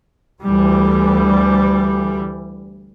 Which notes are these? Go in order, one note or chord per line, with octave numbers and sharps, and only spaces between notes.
D2 E3 G3